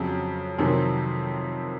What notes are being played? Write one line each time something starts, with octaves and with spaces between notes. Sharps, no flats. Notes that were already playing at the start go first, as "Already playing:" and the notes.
Already playing: F2 C#3 F#3
F2 C3 D#3 F#3